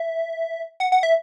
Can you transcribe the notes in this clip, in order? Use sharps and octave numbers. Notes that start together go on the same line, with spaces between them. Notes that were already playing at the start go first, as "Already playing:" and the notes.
Already playing: E5
F#5
F#5
E5